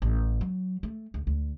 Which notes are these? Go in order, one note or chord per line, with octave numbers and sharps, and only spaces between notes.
A1
F#3
A3
D2
D2